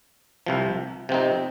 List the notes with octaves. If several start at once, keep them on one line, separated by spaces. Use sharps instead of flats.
C2 C3 F3
C3 F3 C4 D#4